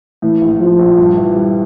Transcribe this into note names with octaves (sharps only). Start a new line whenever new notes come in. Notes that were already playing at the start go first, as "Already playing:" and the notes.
A2 E3
A#1
A#1 F3
A#1
G2
E3
G3